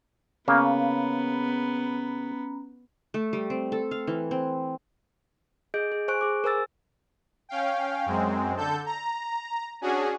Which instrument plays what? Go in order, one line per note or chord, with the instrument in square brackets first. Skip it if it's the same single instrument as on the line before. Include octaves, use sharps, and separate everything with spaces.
[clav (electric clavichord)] C#3 A#3 [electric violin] B3 [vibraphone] C#4 A#5 B5
[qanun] A3
G3
C4
A4
F5
E3
C4
[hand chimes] G#4 D#5 G6 D7
G#4
C5 G#5 C#6 F#6 D7
G#4 D6
A#4 C5 G#5 E6 A6
[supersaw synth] C#4 F5 G5
F#2 G#3 C4
D3 A4 G6
A#5
C#4 D4 F#4 G#4